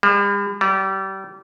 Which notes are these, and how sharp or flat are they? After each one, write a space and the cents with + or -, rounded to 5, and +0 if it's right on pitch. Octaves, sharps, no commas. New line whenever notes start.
G3 +45
G3 -30